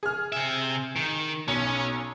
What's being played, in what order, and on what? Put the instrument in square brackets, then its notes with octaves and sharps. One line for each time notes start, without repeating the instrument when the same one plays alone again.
[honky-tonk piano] G#4 F6
[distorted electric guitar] C3 E5
D#3
[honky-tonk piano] B1 [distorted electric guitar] C#4